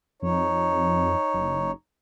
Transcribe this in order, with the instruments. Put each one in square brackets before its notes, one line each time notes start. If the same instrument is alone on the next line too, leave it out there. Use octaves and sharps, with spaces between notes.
[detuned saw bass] F2 [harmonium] D#4 C#5
[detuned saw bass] F#1